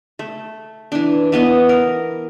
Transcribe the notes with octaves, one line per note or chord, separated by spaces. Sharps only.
A3
E3 D4
E3 B3 D#5
A#4